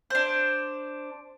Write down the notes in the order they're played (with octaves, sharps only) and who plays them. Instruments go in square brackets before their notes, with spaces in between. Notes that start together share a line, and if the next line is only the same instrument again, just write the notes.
[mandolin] D4 C5